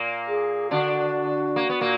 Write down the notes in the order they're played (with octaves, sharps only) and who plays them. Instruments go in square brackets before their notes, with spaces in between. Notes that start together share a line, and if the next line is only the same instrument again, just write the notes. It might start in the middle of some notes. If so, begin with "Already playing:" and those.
Already playing: [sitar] A#2 A#3
[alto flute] G#4
[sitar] D3 D4 [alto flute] F#4
[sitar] A#3
B3
A#2 A#3